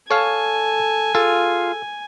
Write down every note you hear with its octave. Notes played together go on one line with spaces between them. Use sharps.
A4 C#5 F5 G#5
F4 G#4 A4